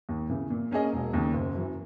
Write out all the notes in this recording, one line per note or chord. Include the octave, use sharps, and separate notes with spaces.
D#2
C#3 E3
A#2
A#3 C#4 G#4 D#5
E1
D#2 C#3
F#1
F#2 E3